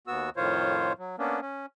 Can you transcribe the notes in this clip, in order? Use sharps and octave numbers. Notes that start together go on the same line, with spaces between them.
D#2 B3 F#4 E6
F2 A2 D#3 F4 C5 C#5
F#3
A#3 B3 C#4 D4
C#4